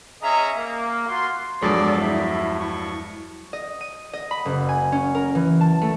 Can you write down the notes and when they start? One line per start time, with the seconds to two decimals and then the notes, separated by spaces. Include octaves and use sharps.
0.22 C#4 G#4 D#5 E5 A#5
0.56 A#3
1.07 F4 F#4 C6
1.62 E2 G2 F3 F#3 G#3 G#4 A4 D5
2.02 E4 E5
2.60 C#6
3.53 D#5
3.81 D#7
4.13 D#5
4.31 B5
4.45 F#1
4.69 G#5
4.92 C#4
5.15 A#4
5.35 E3
5.61 A5
5.82 A3